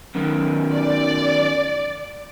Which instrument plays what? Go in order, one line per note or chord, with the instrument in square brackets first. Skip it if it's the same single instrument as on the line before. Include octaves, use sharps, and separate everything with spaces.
[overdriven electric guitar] F#2 D#3
[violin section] D5